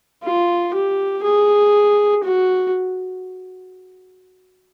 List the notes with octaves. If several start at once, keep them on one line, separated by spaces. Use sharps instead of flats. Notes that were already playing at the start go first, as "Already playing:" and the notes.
F4
G4
G#4
F#4